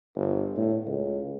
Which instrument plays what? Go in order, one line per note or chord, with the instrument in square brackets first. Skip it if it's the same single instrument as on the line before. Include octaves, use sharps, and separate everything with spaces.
[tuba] G1
A2
C#2